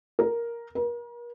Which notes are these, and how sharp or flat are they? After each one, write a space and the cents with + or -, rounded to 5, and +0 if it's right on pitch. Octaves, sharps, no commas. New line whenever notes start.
A#4 +5
A#4 +40